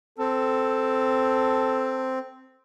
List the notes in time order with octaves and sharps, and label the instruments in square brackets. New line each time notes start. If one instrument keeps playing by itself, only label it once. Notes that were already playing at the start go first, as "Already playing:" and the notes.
[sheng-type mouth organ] C4 [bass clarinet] A4